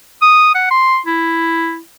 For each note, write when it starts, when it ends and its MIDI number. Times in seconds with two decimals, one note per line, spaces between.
0.22 0.54 87
0.55 0.68 78
0.71 0.99 84
1.06 1.79 64